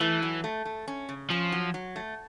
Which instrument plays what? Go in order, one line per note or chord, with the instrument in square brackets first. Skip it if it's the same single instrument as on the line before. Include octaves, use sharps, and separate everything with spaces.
[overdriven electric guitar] E3 [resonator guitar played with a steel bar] A3
[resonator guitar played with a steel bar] F#3
A3
A3
C#4
C#3
[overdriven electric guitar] F3 [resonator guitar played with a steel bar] C#4
[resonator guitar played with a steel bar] F#3
F#3
A3